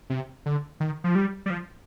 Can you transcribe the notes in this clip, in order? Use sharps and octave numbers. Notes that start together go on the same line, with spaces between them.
C3
D3
D#3
F3
G3
G3
F3